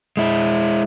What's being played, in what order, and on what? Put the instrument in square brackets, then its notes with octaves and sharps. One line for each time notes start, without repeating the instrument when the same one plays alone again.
[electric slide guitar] G#3 E4